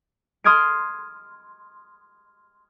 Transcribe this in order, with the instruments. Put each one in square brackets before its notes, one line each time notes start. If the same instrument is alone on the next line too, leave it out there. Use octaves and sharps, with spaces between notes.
[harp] C6 D#6 F6 G#6 A6 D7